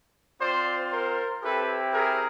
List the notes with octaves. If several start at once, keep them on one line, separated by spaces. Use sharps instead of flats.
C4 F4 C5 D5
A#4 C5
C4 E4 G4 A4 B4
G#4 A#4